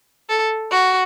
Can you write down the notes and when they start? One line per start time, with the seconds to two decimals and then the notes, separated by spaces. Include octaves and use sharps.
0.30 A4
0.72 F#4